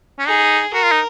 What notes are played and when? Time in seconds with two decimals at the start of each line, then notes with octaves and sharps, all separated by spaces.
0.19 C#4
0.27 D#4 G#4
0.74 F#4 A#4
0.83 F4
0.91 D#4